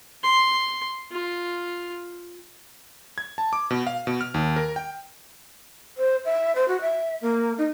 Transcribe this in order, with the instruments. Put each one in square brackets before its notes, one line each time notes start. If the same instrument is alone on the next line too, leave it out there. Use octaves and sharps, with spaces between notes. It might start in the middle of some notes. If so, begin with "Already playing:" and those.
[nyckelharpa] C6
F4
[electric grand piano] G#6
A5
D6
B2
F5
B2
F6
D#2
A#4
G5
[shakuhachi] C5
E5
C5
F#4
E5
A#3
D#4